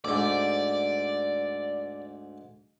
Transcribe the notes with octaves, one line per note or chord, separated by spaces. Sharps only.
D2 G#2 D5